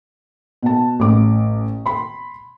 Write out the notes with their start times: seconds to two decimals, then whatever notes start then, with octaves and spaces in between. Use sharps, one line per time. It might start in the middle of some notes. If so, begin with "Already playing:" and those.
0.63 B2 A5
1.00 A1 D6
1.86 B5 C6